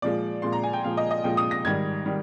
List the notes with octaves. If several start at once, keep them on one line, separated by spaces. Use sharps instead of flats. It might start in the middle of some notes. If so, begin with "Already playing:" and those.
A#2 F3 G#3 D5
A#2 F3 G#3 C6
A#5
G#5
G5
A#2 F3 G#3 F5
D#5
D#5
A#2 F3 G#3 G5
D#6
A#6
G#2 D#3 G3 G#6
D#3 G3